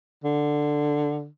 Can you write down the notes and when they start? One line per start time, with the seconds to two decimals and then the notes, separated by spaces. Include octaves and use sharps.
0.24 D3